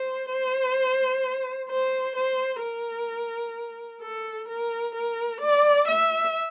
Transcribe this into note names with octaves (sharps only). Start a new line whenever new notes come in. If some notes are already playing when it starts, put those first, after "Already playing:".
Already playing: C5
C5
C5
C5
A#4
A4
A#4
A#4
D5
E5